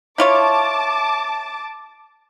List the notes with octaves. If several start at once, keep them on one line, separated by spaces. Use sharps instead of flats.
E4 F4 C#5 A5 D6